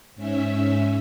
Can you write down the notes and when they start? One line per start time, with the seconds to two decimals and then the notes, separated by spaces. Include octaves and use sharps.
0.16 G#2 C#4 E5